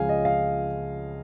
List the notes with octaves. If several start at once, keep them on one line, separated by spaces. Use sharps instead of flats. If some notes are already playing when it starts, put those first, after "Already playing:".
Already playing: C#2 C#3 F3 G#3 F5 G#5
D#5
F5